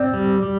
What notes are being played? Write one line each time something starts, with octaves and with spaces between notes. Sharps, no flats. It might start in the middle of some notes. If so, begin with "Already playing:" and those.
Already playing: C4 D5
G3
G3